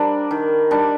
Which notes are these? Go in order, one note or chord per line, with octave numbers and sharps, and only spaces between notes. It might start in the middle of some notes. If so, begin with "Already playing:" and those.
Already playing: G3 D4 G4 A#4 C5
D#3
G3 D4